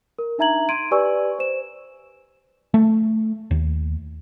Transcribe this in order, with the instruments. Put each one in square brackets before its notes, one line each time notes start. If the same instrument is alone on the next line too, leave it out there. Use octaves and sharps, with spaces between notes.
[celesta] A#4
D4 D#4 E5 A#5 G#6 F#7
C6 G#6 D7 D#7
G4 B4 D5 G#5 C#6 E6
C5 E7
[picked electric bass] A3
D#2